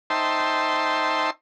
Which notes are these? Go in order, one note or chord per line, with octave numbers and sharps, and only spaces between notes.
D#4 C5 E5 G5 A5 C6